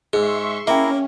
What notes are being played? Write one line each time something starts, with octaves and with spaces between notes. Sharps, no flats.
G#2 G#4 E5 C6 C#6 E6
A#3 C#4 E4 A#4 E5 G5